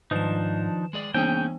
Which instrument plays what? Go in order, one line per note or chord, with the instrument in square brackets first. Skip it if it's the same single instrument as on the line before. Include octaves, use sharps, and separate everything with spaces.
[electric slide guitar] G#2 [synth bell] D#3 E7 [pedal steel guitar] F3 D4 D#4
[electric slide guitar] G#3 G#4 D5
[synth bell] E3 B3 [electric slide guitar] A#3 C#4 G#4 [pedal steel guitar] G5